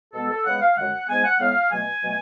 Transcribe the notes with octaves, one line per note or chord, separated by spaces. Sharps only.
B2 G#3 B3 A4
A4
C#3 G#3 B3 F#5
F5
F#2 D3 G#3 F#5
G#2 G#3 B3 G#5
F#5
A2 G#3 B3 F5
B2 F#3 A3 G#5
B2 F#3 A3